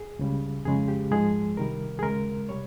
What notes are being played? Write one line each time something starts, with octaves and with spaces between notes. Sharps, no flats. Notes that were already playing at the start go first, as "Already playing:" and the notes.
Already playing: G#4
C#2 C#3 G3
F2 C#3 G#3 G#4
G4
G#2 F3 G#3 G#4
C2 C3 D#3 G3 A#4
G#4
D#2 C#3 G#3 A#4
C3 G3 C#5